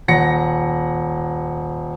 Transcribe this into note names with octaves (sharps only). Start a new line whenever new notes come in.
D#1 F#5 A#6 C#7